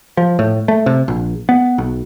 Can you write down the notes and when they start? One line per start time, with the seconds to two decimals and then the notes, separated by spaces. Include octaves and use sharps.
0.17 F3
0.39 A2
0.68 A3
0.86 C3
1.08 A#1
1.49 B3
1.78 B1